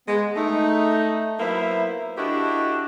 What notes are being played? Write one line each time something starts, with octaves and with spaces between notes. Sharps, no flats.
G#3 B3
A3 D#4
F#3 A#3 B3 E4 C5 E5
D4 E4 F#4 G4 A4 D#5